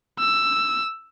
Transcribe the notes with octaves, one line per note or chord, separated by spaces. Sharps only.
E6